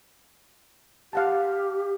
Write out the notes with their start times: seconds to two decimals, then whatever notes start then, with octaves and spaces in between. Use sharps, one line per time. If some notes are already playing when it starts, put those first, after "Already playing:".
1.13 G4 F5 F#5 A5